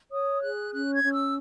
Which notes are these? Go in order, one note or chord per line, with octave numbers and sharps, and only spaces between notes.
C#5 D#6
G#4 F#6
C#4 F#6
G#6
C#4
E6